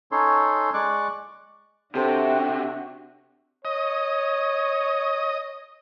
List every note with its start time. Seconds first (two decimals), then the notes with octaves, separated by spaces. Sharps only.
0.12 C#4 D#4 A4 C#5 C6
0.74 G#3 D5 C#6 D6 F#6
1.95 C3 D4 F#4 G4 A4 C5 G5
3.65 C#5 D#5